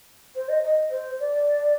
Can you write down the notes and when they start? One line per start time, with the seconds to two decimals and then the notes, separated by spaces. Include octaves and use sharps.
0.35 C5
0.48 D#5
0.64 D#5
0.90 C5
1.20 D5